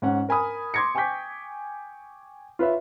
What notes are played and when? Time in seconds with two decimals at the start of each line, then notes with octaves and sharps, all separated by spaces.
0.02 G#2 C#4 F#5
0.29 A#4 G#5 B5 D#6
0.74 C6 D6 G#6 A#6 C#7
0.95 G5 G#5 C#6 D6 G6 B6
2.59 F4 B4 C#5 E5